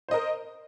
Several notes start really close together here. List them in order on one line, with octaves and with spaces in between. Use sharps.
C5 D#5 A#4